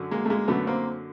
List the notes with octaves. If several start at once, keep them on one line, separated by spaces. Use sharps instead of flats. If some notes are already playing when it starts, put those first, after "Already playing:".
Already playing: F#2 D3 F#3
G#3 A#3
A3
G#3 A#3
F#2 D3 F#3 A3 B3
A#3 C4